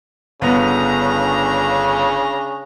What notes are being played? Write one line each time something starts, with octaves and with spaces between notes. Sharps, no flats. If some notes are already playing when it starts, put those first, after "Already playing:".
G1 C#3 B3 D4 A#5